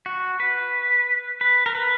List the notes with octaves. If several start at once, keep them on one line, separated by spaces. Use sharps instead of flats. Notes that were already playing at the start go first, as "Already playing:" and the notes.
F#4
B4
B4
A#4
B4